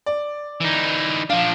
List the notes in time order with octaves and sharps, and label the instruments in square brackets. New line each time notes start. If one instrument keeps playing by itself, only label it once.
[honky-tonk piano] D5
[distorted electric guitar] E3 D#4
[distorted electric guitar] F3 D4 [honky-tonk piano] F5